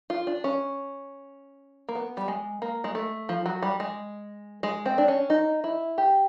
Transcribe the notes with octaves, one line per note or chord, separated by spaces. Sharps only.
F4
D4
C#4
A#3
B3
G3
G#3
A#3
G#3
A3
F3
F#3
G3
G#3
G#3
C4
D4
C#4
D#4
E4
G4